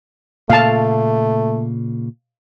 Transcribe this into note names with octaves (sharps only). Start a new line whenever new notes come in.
A#2 C#3 A3 A#3 F5 A5